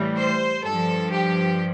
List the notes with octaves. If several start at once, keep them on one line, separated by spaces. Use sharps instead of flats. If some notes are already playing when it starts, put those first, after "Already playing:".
Already playing: A2 E3 G3
C5
G2 F3 A4
G4